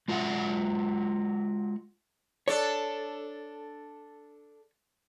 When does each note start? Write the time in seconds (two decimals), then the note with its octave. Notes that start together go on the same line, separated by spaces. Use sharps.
0.08 G#3 F4 F#4 E5 F#5
2.48 D4 A4 C#5 D5